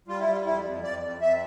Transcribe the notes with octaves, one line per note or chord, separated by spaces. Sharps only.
G3 F4
E4
G3 F4
F2 E4
F2
F2 D5
F2
F2 E5